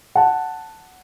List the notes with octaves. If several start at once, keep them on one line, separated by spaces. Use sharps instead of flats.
F#5 A5